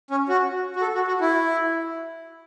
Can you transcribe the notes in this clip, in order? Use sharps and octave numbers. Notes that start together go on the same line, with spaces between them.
C#4
F#4
F#4
A4
F#4
F#4
E4